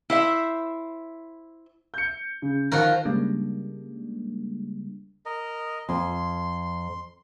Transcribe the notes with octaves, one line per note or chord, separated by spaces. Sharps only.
E4 C5 E5
G6 C#7
C#3
D#3 F3 F#4 A#4
C#3 G3 G#3 A#3 D4
A#4 D#5
F2 C6